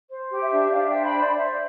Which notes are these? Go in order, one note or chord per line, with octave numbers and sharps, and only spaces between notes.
C5
G4
E5
D4
D4 D5 F5
C5 E5 G5
G5 B5
C5 D5
C5 E5